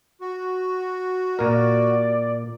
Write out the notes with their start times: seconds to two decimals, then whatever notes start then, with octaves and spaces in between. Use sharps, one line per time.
0.21 F#4
1.39 A#2 A#4 D5